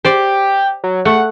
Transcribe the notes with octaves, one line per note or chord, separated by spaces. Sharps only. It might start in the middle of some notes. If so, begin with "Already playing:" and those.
G4 C5 D5
F#3
A3 F#5